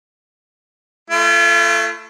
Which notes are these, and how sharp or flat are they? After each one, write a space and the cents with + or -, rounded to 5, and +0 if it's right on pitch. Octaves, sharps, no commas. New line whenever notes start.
A3 +0 F4 -40